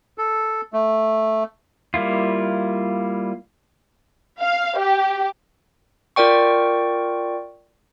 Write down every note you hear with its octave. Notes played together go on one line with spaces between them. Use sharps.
A4
A3
G3 A#3 E4 F4
F5
G4
F4 A#4 D5 G5 C#6